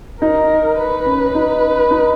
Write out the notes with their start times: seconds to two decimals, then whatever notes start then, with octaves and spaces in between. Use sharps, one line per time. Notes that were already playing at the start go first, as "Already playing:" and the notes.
0.21 D#4 A#4
0.78 B4
1.06 C#4
1.35 D#4
1.91 D#4